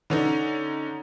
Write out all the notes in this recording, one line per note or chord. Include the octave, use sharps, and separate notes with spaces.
D3 C#4 D#4